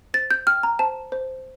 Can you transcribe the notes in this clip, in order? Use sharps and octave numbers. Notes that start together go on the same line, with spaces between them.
C5 A6
G6
G5 F6
A#5
C5 A5
C5